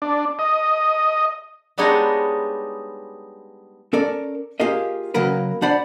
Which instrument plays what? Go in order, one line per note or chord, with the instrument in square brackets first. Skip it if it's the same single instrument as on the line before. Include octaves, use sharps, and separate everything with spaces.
[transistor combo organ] D4
D#5
[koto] G3 G#3 B3 D4 D#4 C#5
[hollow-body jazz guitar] C#4 A4 A#4 D5
A#3 F4 G4 G#4 A#4 D#5
C#3 F#3 A#3 A#4 B4
D4 C5 D5 F#5 B5